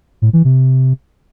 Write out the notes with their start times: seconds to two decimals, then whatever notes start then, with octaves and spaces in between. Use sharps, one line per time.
0.22 A2
0.33 E3
0.45 C3